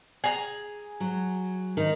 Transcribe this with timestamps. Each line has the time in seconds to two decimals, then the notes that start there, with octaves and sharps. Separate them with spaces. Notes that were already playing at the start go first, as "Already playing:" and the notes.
0.24 G#4 A#5
1.00 F#3
1.77 D#3 D#4